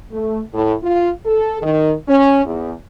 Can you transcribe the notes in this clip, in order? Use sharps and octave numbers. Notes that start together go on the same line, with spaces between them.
A3
A2
F4
A4
D#3
C#4
E2